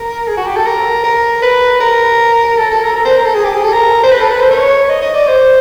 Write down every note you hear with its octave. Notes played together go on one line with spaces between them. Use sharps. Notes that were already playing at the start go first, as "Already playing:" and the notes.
Already playing: A#4
G#4
F#4
G4
A4
A#4
A#4
B4
A#4
A4
A4
A#4
A#4
C5
A#4
A4
G#4
G4
G#4
A4
A#4
C5
B4
A4
B4
C5
C#5
D#5
D#5
D5
C5